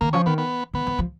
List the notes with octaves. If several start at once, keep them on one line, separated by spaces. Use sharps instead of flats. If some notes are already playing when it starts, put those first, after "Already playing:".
D#3 A#3
F3 C#4
D#3 B3
B3
D#3 B3
F3
F3